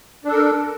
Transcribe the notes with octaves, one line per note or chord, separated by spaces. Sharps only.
D4 A4 A#4